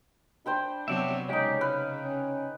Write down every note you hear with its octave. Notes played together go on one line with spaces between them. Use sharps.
D4 C5 G5 B5
C3 F#3 B3 C#5 D5 E5
C#3 G#3 D#4 G4 C#5 D5 F5
B4 F6
C#4